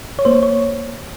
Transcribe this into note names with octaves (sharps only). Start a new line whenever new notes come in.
C#5
A#3 C5
C#5